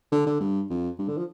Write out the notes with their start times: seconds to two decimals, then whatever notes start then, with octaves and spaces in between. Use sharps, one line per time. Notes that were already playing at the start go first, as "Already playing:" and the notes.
0.12 D3
0.26 D3
0.40 G2
0.70 F2
0.98 G2
1.08 D3
1.17 F3